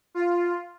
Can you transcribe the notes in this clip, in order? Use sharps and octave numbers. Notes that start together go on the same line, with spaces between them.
F4